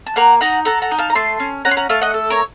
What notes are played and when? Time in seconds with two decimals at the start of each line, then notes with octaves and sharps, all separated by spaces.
0.06 A5
0.16 A#3 F#5 A#5
0.41 D#4 F#5 A#5
0.65 A4 F#5 A#5
0.82 F#5 A#5
0.91 D#4
0.98 F5 A5
1.10 A#5
1.15 A3 A5 C6
1.40 C#4
1.65 C#4 F#5 A#5
1.71 C6
1.77 F#5 A#5
1.89 A3 F5 A5
2.01 D#5 F#5
2.14 A4
2.30 A#4 C#5